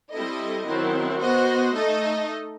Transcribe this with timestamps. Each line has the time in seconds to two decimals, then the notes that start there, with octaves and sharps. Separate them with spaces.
0.12 G3 C4 E4 A4 D#5
0.66 D#3 F#3 C4 E4
1.20 B3 F#4 C5 D#5
1.74 A3 D#4 A4 D#5